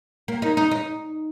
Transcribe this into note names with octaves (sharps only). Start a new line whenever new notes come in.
A#3
D#4
D#4
D#4